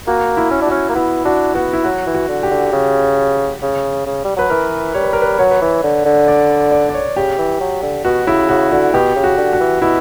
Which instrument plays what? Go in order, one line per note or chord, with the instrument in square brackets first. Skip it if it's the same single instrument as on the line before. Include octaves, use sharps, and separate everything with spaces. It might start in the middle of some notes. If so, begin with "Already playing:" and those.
[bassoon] A#3 [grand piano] F#4
[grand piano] E4
[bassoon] C#4
[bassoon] D4 [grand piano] F#4
[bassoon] C#4
A#3
[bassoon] B3 [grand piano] E4
[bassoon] D4 [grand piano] F#4
[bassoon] B3 [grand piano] F#4
[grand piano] E4
[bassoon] F#3 [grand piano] F#4
[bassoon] E3
[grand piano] F#4
[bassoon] D3
[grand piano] G4
[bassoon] D3
C#3
C#3
C#3
G3
[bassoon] F#3 [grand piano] B4
[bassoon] E3 [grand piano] A#4
[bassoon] G3 [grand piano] C#5
[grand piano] B4
A#4
B4
[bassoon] F#3 [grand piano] C#5
[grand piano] B4
[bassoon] E3 [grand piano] C#5
[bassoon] D3
D3
[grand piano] D5
D5
D5
C#5
[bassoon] C#3 [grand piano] G4
[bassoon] E3
F#3
D3
[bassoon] B2 [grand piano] F#4
[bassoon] C#3 [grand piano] E4
[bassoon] C#3 [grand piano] F#4
[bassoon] D3 [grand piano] F#4
[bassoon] B2 [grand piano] G4
[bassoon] C#3
[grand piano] F#4
[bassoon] D3
[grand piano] F#4
[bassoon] E3
[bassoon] B2 [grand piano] E4